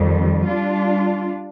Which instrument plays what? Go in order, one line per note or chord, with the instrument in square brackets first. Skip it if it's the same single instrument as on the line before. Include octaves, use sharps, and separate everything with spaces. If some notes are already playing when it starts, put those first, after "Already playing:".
Already playing: [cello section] F2 D#3 G3
G3 D4 F4